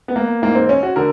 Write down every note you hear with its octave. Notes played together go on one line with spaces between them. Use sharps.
B3
A#3
G#2 E3 A#3
C4
C#4
F#4
D3 A#4